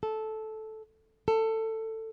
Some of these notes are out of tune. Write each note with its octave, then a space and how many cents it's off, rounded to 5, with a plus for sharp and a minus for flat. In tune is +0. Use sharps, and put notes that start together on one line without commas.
A4 -10
A4 +15